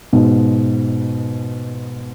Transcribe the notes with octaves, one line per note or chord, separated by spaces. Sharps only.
G#2 B2